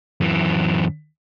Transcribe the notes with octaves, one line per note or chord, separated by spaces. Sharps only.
F#2 E3